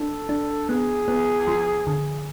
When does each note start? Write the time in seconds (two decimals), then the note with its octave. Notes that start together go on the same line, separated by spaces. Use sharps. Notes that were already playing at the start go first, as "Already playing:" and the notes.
Already playing: D4 A4
0.29 D4
0.69 B3 G#4
1.08 B3
1.47 F3
1.87 D3